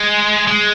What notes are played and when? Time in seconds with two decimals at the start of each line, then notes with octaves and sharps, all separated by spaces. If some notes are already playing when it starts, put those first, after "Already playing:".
Already playing: G#3
0.47 G#3